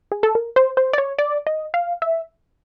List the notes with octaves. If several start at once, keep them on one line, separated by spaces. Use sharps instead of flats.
G#4
A4
A#4
C5
C5
D5
C#5
D5
D#5
F5
E5